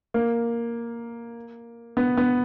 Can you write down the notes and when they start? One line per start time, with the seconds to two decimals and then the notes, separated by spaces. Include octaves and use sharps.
0.14 A#3
1.97 B3
2.17 B3